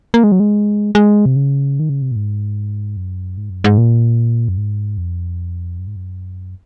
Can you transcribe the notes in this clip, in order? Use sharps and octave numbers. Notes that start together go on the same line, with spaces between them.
A#3
G#3
F#3
G#3
G#3
C3
C#3
D#3
C#3
C3
A#2
G#2
F#2
G#2
F#2
G#2
A#2
F#2
G#2
F2
F#2
G#2
F#2